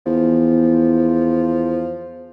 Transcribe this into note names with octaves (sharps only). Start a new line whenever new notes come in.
E2 F3